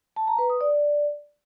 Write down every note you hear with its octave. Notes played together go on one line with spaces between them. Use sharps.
A5
A#5
B4
D#6
D5